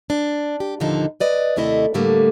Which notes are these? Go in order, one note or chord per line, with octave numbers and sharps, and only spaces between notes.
D4
G4
D#2 A#2 D3 F3 D#4 E4
B4 D5 D#5
D#2 C3 A3 E4 D#5
A2 D3 G3 A3 A#3